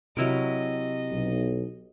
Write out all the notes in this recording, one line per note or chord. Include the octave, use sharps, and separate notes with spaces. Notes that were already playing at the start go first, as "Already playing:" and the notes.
C3 F#3 E4 A#4 D#5
B1